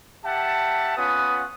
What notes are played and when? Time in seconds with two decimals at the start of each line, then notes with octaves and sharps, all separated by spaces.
0.25 G4 E5 F#5 A5
0.97 B3 C#4 F4 B4 F#5 D#6